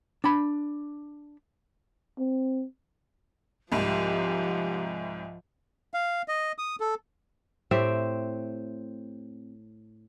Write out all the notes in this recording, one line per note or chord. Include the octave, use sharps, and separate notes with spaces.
D4 B5
C4
C2 G#2 F3 G4
F5
D#5
D#6
A4
A2 C4 G4 E5